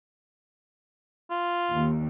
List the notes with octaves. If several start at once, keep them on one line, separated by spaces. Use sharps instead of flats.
F4
D#2